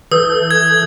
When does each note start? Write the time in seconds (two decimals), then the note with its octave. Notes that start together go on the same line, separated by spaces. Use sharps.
0.12 E3 A4 D#6 G6
0.51 G#6